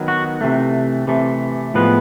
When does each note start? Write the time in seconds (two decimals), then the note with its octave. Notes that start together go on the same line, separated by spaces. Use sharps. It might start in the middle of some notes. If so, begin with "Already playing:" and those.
Already playing: D#3 F#3 B3
0.08 F#4
0.41 C3 E3 A3
1.07 C3 E3 A3
1.74 A2 F3 G#3 B3 B4